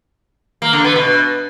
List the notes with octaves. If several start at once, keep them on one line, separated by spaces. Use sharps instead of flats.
A#3
D3
B3
B2